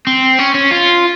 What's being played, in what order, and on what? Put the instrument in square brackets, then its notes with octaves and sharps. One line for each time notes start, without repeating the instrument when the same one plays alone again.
[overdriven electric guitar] C4
C#4
C#4
F4